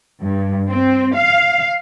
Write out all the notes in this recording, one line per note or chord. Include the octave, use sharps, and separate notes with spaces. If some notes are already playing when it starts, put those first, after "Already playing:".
G2
C4
F5